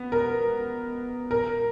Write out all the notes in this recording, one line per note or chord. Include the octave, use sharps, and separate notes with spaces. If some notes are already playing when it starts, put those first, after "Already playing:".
Already playing: B3
A#4
A#4